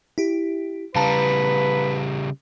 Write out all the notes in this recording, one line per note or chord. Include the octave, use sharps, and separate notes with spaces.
E4 G4
C#3 G3 B4 F5 A5 A#5